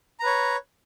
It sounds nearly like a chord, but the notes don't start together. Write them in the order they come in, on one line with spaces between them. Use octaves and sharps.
A#5 B4 C#5